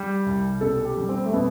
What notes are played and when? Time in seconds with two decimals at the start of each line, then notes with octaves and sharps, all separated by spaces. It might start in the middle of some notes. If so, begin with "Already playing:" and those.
Already playing: G3 G4
0.26 C2
0.61 B2 A4
0.85 G4
0.97 G3
1.09 C4
1.26 A3
1.33 B2 B3